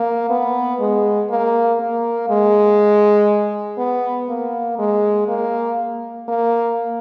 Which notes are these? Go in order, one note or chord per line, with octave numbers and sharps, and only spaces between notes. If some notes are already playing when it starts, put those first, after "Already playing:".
Already playing: A#3
B3
G#3
A#3
A#3
G#3
B3
A#3
G#3
A#3
A#3